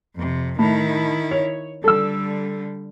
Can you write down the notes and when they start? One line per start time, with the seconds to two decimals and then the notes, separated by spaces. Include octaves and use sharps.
0.16 F2 C3
0.59 A2 D#3 E4
1.31 C#5
1.84 D3 G3 A4 E6